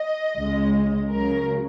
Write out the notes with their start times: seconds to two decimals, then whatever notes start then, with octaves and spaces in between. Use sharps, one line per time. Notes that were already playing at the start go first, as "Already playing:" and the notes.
Already playing: D#5
0.37 C#2 C#3 G#3
1.11 C#2 C#3 F#3 A#4